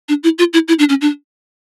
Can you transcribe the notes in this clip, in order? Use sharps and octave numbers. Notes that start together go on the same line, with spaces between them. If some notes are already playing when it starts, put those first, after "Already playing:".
D4
E4
F4
E4
E4
D4
C#4
D4